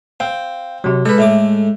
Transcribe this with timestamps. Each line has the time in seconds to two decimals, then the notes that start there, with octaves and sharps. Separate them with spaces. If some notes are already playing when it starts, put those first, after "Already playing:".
0.20 C4 F5 G5
0.84 C3 F#3
1.05 G#3 A4 B4
1.18 A2 A3 D6